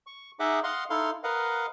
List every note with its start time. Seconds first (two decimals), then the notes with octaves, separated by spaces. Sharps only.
0.07 C#6
0.40 D#4 G#4 D#5 E5 F#5 D6
0.64 D#5 F5 F#5 C6
0.90 D#4 E4 A4 F5 C6
1.24 A#4 B4 D#5 F5 F#5